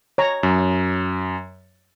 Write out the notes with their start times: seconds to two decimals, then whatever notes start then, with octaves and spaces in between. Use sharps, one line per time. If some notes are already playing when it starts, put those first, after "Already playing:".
0.18 C#5 A#5
0.43 F#2